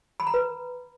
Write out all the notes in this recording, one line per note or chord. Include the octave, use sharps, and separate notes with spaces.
B5
A#5
B4